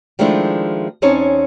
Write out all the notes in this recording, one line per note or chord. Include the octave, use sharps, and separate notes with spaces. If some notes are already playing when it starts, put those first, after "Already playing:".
D#3 F3 G#3 A3 D4 E4
E2 C4 C#4 D#4 C#5 A5